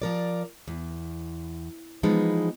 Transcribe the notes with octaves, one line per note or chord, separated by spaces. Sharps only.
F3 A#4 D5
E2
E3 F3 G#3 B3 D#4